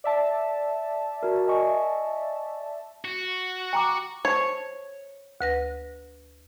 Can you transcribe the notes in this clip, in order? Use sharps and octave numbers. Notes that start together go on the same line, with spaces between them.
D5 E5 A5
F#4 A#4
D#5 G#5 C#6
F#4
G5 A#5 D6
C5 C#5 A5
D2 B4 A#6